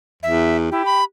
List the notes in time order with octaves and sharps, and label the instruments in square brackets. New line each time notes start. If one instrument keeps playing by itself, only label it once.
[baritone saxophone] E2 [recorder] E5
[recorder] E4 [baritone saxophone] G4
[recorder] B5